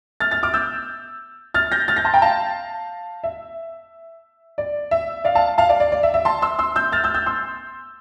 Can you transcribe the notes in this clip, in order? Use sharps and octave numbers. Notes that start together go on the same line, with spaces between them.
F6 A6
F6 A6
D6 F6
E6 G6
F6 A6
G6 A#6
F6 A6
G6 A#6
A5 C6
G5 A#5
F5 A5
E5
D5
E5
D5 F5
F5 A5
F5 A5
D5 F5
D5
D5
E5
E5
A5 C6
C6 E6
C6 E6
E6 G6
F6 A6
E6 G6
E6 G6
C6 E6